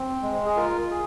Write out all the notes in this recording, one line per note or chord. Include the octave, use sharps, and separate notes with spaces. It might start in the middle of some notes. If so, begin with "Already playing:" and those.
Already playing: C4
G#3
G#4
F4 A#4
G#4